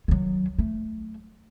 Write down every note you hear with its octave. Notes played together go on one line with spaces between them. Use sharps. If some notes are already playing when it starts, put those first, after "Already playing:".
D#3 F#3
A3